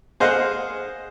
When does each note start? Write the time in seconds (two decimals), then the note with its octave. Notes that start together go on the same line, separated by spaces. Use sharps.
0.20 G#4 C5 D#5 F5 F#5